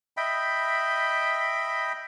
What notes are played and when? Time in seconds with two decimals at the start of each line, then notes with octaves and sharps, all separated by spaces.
0.17 D#5 E5 G5 B5